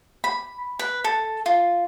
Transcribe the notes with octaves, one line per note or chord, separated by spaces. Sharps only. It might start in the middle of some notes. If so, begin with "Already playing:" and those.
B5
B4
A4
F4